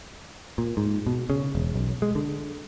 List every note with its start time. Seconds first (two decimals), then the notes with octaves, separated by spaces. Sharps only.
0.58 A#2
0.77 G#2
1.06 B2
1.30 C#3
1.55 E1
1.74 B1
2.02 G#3
2.15 D3